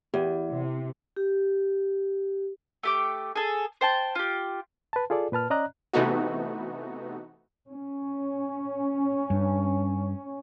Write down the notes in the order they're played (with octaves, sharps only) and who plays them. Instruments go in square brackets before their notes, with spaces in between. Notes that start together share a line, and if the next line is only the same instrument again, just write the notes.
[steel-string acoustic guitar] E2 [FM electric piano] G4
[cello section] C3
[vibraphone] G4
[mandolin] A3 G4 D6
G#4 A4
C5 G5 A5
F4 G4
[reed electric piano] B4 A5
F4 G#4 A4 D5
A#2 B4 A5 F6
C#4 D5 D#5 A#5 F#6
[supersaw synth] C3 E3 A3 B3 D#4 F#4
[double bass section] C#4
[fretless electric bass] G2